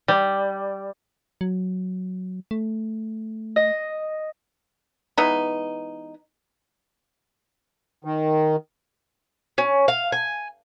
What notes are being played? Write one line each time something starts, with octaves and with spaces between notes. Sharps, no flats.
G3
F#3
A3
D#5
E3 G#3 B3 D#4
D#3
C#4
F5
G#5